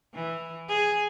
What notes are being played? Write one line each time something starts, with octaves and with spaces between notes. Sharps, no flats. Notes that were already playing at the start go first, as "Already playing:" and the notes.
E3
G#4